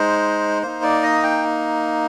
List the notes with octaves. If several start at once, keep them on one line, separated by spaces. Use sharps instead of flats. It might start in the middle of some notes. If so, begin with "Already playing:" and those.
Already playing: G#3 D#4 C5
A#3 D#4 C5
D5
D#5
G5